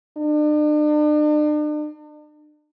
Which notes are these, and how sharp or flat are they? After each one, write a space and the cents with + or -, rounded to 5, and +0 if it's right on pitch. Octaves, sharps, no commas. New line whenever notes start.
D4 +40